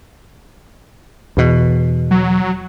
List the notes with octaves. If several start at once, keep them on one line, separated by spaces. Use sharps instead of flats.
E2 B2
F#3